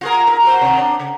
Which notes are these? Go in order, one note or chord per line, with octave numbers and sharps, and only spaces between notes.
F4 G#4 A#4
D#4 A#4
F#4 A#4 C5
C3 D#3
D4
C#3